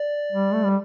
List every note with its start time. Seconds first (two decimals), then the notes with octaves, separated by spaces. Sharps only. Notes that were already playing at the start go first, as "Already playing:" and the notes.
Already playing: D5
0.32 G3
0.53 A3
0.65 G3